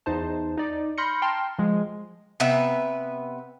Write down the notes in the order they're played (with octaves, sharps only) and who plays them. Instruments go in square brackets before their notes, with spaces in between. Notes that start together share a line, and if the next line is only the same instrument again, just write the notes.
[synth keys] E2 D#4 C5 A5
D#4 D5
B5 C6 F6 G6 A#6 C#7
G5 A5 A#5 C6 F6
F3 G#3
[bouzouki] C3 B3 B4 E5